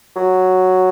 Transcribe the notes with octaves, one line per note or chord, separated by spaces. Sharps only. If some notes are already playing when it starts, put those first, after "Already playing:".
F#3